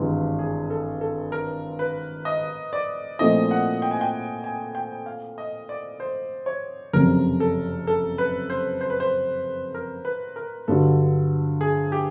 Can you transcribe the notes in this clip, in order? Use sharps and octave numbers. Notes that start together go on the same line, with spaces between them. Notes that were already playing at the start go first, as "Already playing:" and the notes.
Already playing: G#1 G2 E3 G#3 B3
G#4
A4
A4
A#4
B4
D#5
D5
A#2 F3 A3 C4 E4 D#5
F#5
G5
G#5
G5
G#5
G5
F5
D#5
D5
C5
C#5
F#1 F2 C3 A#4
A4
A4
B4
C5
C5
B4
C5
A#4
B4
A#4
G2 D3 F#3 A4
G#4
G4